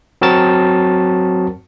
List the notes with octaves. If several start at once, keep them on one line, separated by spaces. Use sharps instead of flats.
F#3 C4 F#4 A#4 A5 A6